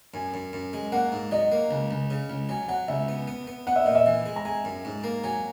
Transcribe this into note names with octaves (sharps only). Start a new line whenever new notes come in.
F#2 G#5
F#2
F#2
G#3
A#3 F#5
G#2
F#3 D#5
A#3
C#2
C#2
C#3
C#2
F#3 G#5
F#3 F#5
C#2 E5
B3
B3
B3
B3 F#5
E5
A#2 D#5
E5
E3
G#3
A#5
G#3 G#5
F#2
G#2
A#3
F#3 G#5